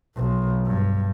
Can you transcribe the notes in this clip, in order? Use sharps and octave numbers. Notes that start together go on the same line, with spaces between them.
B1
G2